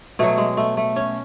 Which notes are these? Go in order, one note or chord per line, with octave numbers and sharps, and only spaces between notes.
B2 F#3 A3
G#3
A3
A3
C#4